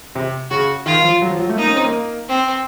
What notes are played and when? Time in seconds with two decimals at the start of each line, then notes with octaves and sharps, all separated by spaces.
0.15 C3
0.51 C#3 F#4
0.86 D#3 F4
1.04 F3
1.22 F#3
1.31 F3
1.40 F#3
1.49 A3
1.57 A#3 D#4
1.67 C#4
1.76 C4
1.85 A#3
2.29 C4